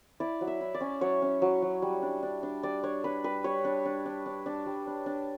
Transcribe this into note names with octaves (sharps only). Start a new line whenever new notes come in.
E4 D5
F#3
E5
E4
D5
C#4
F#3 C#5
C#4
F#3
F#3
G3
D4
D4
D4
G3 D5
D4 C#5
D4 B4
G3 B4
G3 C#5
D4
D4
D4
D4
D4
G3
D4
D4